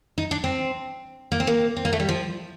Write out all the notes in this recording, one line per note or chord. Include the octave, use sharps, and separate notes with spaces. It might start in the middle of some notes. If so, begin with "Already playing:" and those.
D#4
D4
C4
A#3
C4
A#3
C4
A#3
A3
G3
F3